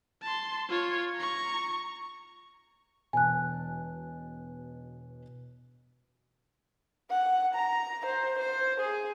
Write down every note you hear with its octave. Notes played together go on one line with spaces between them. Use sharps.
A5 C6
F4 C#5
A#5 C#6
E1 B2 G#5 A5 F#6
F#5
A#5
C5
C5
G#4